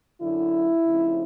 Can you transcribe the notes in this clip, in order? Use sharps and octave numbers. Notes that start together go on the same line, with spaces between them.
F#2 D3 F#3 E4
C#3 F3 A3 C4 D#4